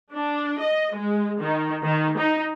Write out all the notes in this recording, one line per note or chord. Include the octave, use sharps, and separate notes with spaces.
D4
D#5
G#3
D#3
D#3
D#4